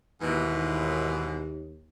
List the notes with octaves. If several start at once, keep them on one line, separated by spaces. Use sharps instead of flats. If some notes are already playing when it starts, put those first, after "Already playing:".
D#2 G#2 B2 E3